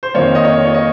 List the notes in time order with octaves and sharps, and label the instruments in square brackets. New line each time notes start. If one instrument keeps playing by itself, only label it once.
[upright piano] C5
F2 D#3 A#3 C#5
D#5
C#5
C#5
D#5